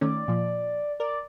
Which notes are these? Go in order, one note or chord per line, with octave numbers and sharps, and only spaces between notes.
D#3 A3 C#4 D5
A#2 F3
A#4 D5